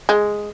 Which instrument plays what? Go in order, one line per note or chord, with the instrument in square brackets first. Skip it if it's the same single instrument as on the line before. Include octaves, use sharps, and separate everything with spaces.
[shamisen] G#3